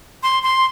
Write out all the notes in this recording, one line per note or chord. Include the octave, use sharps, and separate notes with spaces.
C6
C6